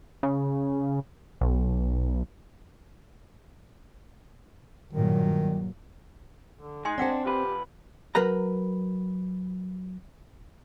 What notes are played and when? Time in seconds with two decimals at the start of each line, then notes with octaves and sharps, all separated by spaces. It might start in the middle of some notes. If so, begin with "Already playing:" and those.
0.23 C#3
1.41 B1
4.93 G2 A#2 D#3 F#3
6.59 D3
6.85 G#3 D#4 G#5 C6
6.98 C4 D4 C5 D5 F#5 G5
7.25 F2 G4 B4
8.15 F#3 A#4 B4 A#5